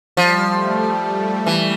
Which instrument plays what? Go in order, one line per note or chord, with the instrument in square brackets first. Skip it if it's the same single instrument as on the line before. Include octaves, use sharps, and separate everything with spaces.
[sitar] F3 [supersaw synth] G3
[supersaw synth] A3
G3
[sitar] E3